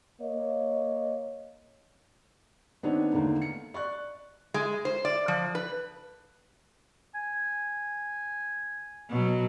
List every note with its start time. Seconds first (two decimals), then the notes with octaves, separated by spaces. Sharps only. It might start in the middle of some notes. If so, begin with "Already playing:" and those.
0.21 A#3 C#5 D#5
2.83 D#3 B3 C4 D4 D#4 C#5
3.12 E2 D3 D#3 A3 A#3
3.42 C#7
3.74 D5 C#6 F#6
4.54 G#3
4.85 C5
5.05 D5
5.28 F3
5.55 B4
7.15 G#5
9.09 B2 F#3